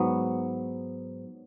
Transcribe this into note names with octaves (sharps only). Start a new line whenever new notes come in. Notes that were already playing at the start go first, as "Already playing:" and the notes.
Already playing: G#2 F#3 B3